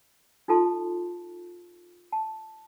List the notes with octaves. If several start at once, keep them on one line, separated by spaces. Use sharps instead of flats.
D#4 F4 A4 A5 C6
A5